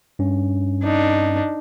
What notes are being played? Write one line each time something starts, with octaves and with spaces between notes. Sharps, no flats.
G2 C#4
D4 D#4